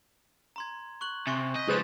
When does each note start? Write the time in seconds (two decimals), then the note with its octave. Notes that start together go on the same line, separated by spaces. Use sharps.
0.56 A#5 C6 G#6
1.01 C#6 F#6 F#7
1.27 C3 G#5 C6 C#6
1.56 D#5 G6 B6
1.68 C#2 F3 G#4 B4 C5 G6 A6 E7